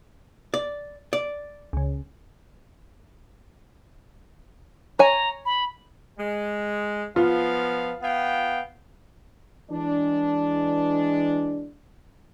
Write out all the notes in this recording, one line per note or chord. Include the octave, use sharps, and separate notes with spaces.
D5
D5
C#2 C#3
C#5 G#5 A#5
B5
G#3
F3 B3 F4 F5
B3 F5 G5
E3 G#3 D4